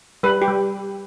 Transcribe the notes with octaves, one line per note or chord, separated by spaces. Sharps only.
G3 B4
G4
G3